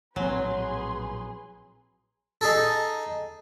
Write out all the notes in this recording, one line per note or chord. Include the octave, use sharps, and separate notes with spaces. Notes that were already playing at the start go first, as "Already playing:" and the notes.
A#1 A2 F#3 C4 G#4 B4 C6
D#4 G#4 A4